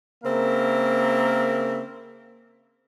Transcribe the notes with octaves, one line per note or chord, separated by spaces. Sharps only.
C#3 A#3 C4 A#4 E5